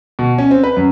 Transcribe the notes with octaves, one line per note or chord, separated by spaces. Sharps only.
B2
C#4
C4
B4
F#2